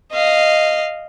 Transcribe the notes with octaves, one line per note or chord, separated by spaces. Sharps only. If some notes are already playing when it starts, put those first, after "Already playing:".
D#5 F5